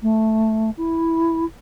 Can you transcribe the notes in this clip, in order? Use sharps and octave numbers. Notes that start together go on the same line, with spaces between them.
A3
E4